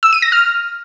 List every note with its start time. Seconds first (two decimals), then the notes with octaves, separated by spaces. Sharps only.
0.03 E6
0.13 D#7
0.22 A#6
0.32 F6